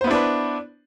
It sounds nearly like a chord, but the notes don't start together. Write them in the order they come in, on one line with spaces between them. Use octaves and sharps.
C5 B3 E4 D4 B4